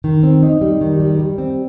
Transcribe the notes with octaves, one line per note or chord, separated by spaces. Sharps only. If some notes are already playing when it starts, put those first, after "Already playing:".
D#3
C4
D#4
G3
D#3
G3
G3
C4